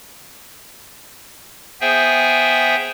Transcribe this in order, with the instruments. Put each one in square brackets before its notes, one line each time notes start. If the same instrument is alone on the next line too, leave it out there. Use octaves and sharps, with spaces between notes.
[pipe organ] B3 G#4 C5 E5 G5 G#5